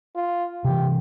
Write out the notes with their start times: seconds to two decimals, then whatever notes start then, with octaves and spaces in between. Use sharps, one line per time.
0.15 F4
0.64 C3 E3 G4